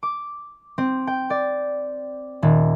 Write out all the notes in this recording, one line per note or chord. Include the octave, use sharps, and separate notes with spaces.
D6
C4
G5
D5
D#1